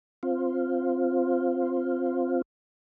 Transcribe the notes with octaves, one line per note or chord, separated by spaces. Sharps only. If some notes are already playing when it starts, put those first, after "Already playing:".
C4 F4